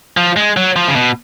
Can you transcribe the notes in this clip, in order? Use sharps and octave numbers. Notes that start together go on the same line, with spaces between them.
F3
G#3
F#3
F3
C#3
B2